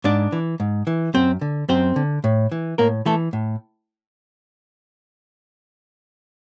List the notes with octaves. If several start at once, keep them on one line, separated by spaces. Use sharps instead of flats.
G#2 D4 D5
E3
G#2
E3
F#2 C4 C5
D3
F#2 C4 C5
D3
A2
E3
A2 A#3 A#4
E3 A3 A4
A2